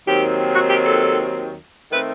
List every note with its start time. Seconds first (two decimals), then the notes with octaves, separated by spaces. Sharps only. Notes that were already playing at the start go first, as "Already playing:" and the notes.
0.06 D#2 D#3 F#3 C4 G4
0.53 F#4
0.67 G4
0.84 A4
1.92 D#3 A3 C4 B4